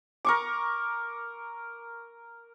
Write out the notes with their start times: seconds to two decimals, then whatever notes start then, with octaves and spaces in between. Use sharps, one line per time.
0.25 A#4 C#6 D6